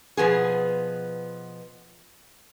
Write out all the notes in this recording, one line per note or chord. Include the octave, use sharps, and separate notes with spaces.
B2 F3 B3 G#4